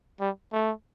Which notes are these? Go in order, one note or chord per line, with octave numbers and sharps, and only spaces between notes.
G3
A3